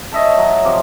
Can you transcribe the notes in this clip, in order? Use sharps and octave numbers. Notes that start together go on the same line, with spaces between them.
C#5 D#5 E5 A5
F#3
C3 F3 D6